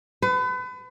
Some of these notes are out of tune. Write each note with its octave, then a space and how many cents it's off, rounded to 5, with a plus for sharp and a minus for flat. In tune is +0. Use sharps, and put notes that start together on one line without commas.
B4 +35